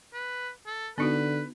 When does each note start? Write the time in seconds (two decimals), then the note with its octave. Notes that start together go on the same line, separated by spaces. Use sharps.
0.13 B4
0.66 A4
0.98 D3 B3 D#4 F#4 B4